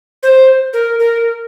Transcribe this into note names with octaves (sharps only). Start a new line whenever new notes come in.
C5
A#4
A#4